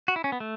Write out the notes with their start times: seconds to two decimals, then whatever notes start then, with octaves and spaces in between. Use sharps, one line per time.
0.08 F#4
0.16 E4
0.24 C#4
0.32 B3
0.40 A3